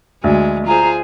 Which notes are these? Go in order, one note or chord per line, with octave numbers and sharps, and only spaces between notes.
D2 G#3
F4 G#4 C5 A#5